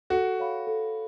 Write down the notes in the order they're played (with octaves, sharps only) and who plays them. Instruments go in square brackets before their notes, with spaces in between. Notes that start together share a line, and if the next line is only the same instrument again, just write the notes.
[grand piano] F#4 [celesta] A4
[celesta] C#5 F5 B5
A4